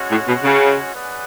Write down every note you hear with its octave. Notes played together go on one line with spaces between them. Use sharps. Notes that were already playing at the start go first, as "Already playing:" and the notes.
Already playing: G#3 C#4 F#4 C#5 F#5
A2
B2
C#3
C#4 G#4 B4 D5 F#5